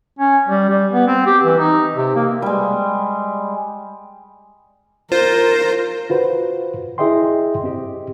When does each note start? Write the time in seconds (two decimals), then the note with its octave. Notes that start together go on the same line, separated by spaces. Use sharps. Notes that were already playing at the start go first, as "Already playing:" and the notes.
0.19 C#4
0.48 G3
0.69 G3
0.91 B3
1.07 C4
1.26 G4
1.43 E3
1.59 D#4
1.96 C3
2.15 A#3
2.42 G3 G#3
5.12 F4 A#4 C5
6.10 F4 F#4 B4 C5
6.98 E4 G#4 D#5 E5 G5 C6
7.64 C4 G4 D#5